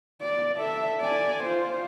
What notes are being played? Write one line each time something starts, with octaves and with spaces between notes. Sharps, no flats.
D5
A4 E5
D5 G#5
F4 C5